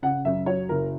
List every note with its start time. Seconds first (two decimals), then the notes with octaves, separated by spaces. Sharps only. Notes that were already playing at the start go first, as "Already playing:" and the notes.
0.02 C#3 F#5
0.25 F#2 E5
0.46 F#3 C#5
0.69 F#1 A#4